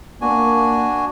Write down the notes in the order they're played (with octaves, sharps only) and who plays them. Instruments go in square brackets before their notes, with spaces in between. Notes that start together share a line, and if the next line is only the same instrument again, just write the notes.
[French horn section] A#3 [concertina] D4 F#4 G#5